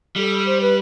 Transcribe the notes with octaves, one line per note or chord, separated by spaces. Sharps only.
G3 A4
C5
B4